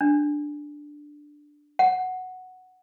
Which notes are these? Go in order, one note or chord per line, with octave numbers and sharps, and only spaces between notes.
D4
F#5